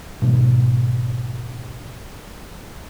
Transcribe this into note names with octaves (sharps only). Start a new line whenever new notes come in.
G#2 B2 D#3 G3